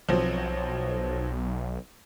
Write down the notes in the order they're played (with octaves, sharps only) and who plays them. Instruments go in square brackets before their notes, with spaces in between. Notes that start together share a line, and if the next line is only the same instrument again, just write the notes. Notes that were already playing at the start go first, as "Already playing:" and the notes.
[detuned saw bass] B1 [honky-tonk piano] F3 F#3 C4